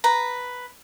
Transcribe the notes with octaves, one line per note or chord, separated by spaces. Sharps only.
B4 A#5